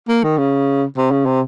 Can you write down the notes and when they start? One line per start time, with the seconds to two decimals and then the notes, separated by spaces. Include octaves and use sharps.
0.08 A#3
0.23 D#3
0.38 C#3
0.97 C3
1.11 C#3
1.26 C3